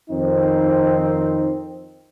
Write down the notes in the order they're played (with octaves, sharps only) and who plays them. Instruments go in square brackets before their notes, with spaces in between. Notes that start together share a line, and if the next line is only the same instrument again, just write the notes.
[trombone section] F2 D#3 C4 D#4